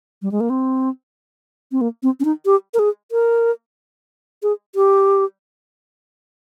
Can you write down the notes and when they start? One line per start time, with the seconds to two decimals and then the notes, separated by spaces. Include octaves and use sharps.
0.22 G3
0.32 G#3
0.40 A#3
0.50 C4
1.72 C4
1.81 A#3
2.03 C4
2.20 C#4
2.25 D#4
2.46 G4
2.74 A#4
2.79 G#4
3.12 A#4
4.43 G#4
4.75 G4